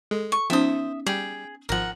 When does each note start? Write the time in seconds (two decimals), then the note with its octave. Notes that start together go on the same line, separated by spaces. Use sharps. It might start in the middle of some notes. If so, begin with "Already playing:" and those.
0.11 G#3 A4
0.32 C#6
0.50 F3 B3 C#4 D#4 C5 E5 D#6
1.07 G3 G#4 G5
1.69 G#1 F3 A#4 F#5